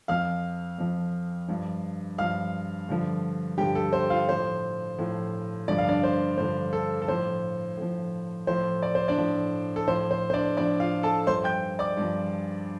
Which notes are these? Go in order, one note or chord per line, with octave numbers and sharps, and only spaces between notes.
F2 F3 F5 F6
F2 F3
G2 F3
G2 F3 F5 F6
G2 D3 F3
G2 D3 F3 G4 G5
A4
C5
F4 F5
A2 F3 C5
A2 F3
G2 D3 F3 D5
F5
D4 D5
C5
G2 D3 F3 C5
A4
A4
A2 F3 C5
A2 F3
A2 F3 C5
D5
C5
D4 D5
A2 F3
A4
A2 F3 C5
C5
C5
D4 D5
A2 F3 D4 D5
F4 F5
A4 A5
G2 F3 C5 C6
G5 G6
D5 D6
G2 F3